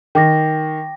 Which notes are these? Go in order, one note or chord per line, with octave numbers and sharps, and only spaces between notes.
D#3 G5 D6 A#6